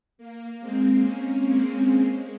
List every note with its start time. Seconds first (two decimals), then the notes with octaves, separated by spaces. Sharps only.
0.18 A#3
0.60 G#3 C4
1.02 A#3 C#4
1.45 G#3 C4
1.89 G#3